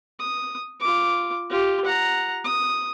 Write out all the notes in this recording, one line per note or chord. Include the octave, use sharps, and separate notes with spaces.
D#6
F4 D6
F4 G4
F#5 A#5
D#6